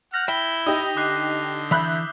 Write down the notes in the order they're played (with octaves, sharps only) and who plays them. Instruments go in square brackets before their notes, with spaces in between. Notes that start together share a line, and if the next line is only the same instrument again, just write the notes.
[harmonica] F#5 F6 [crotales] G6 A#6
[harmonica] E4 [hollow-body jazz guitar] E5 G5 [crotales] B6 G7
[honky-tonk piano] D#4 G4 D#5 [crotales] D#6 G6
[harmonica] D3 [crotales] D6 F#6 C7
[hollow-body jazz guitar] E3 B5 [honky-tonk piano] E5 F#6 G6